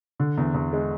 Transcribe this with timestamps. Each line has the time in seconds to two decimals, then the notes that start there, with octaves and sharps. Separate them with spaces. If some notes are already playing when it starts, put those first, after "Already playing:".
0.20 D3
0.38 E2
0.54 E2
0.73 G#3